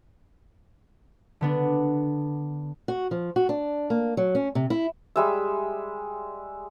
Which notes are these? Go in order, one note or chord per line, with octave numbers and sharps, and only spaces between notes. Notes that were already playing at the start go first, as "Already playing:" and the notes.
D3 B3 D4
F#4
F3
F#4
D4
A#3
F#3
C#4
C3
E4
G3 G#3 E5